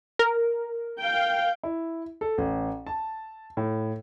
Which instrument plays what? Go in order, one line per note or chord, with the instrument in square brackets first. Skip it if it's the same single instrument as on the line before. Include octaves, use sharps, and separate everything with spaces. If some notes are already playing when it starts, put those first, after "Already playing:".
[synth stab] A#4
[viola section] F5 G5
[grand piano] E4
A4
A1
A5
A2